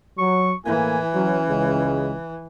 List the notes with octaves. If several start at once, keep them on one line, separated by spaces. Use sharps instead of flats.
F#3 C#6
A2 E3 A#3 E4 G#5
F#3 C#4
C#2 C#3 G#3